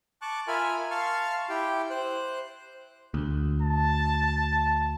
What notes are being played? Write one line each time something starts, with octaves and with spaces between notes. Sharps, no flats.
A5 C#6 D6 F#6
F4 A#4 E5 G#5 B5 F6
F5 A5 C6 C#6 F6
E4 G4 G5
C5 F#6
D2
A5